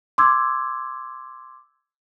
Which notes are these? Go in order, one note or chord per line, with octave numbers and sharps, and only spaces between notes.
C6 D6 E6 G#6